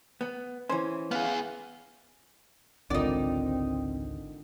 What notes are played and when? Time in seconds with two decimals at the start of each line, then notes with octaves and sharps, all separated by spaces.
0.21 B3
0.69 E3 C#4 C5
1.11 B3 G#4 F5
2.90 G#1 C#2 D3 F3 C4 D#4 A#4 D5